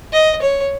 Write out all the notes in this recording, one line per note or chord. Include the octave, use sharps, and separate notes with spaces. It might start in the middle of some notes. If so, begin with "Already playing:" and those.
D#5
C#5